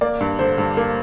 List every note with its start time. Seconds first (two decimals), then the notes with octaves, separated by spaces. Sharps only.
0.01 A#3 D5
0.21 G2
0.39 D3 C5
0.58 G2
0.77 A#3